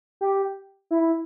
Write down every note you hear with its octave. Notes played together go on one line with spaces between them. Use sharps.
G4
E4